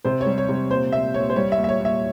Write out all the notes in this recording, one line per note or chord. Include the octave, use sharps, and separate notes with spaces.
C3 C5
C#5
G3
C#5
C3
A#2 C5
A#2 E5
A#2 C#5
C5
G3 C#5
E5
A#2
E5
C#5
A#2
E5